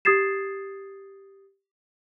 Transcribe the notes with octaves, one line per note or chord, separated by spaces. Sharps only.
G4 D#6 G#6 A6 C7 E7